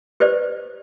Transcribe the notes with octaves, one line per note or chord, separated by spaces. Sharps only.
G4 B4 C5 D5